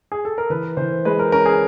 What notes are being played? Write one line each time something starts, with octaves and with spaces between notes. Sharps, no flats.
G#4
A4
A#4
E3 B4
E3 C5
G#3 B4
A#4
C#4 A#4
G#4